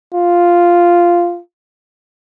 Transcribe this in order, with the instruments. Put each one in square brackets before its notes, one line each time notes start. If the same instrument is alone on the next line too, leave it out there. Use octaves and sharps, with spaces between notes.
[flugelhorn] F4